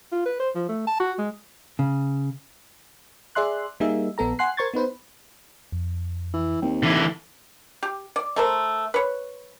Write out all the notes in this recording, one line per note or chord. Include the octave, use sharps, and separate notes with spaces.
F4
B4
C5
F3
A3
A5
F#4
G#3
C#3
G#4 D5 E5 C6 F#6
G3 A#3 D#4 G#4 E5
A#1 B3 A4 A#5
F#5 G#5 C6 F#6 C7
A#4 C5 C6 C#6 G#6 A6
B3 D#4 B4 C5
F2
E3
D#2 A#3 C4 G5
D3 E3
G4
D5
A3 A#4 C5
B4 C#5